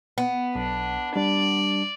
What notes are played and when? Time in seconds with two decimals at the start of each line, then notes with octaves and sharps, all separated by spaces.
0.18 B3
0.55 B1 D4
1.16 G3 D4 D5